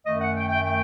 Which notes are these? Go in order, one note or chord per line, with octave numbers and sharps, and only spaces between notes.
F#2 D#3 A3 D#5
F#5
G5
G5
G5